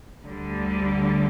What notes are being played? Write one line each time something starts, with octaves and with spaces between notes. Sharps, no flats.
D2 D3 G3